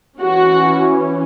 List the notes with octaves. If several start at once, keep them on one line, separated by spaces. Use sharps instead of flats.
E3 C#4 F#4